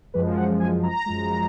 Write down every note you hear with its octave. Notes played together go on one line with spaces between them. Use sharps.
F#2 F3 G#3 B4
F#5
G#5
A#5
F#2 F3 G#3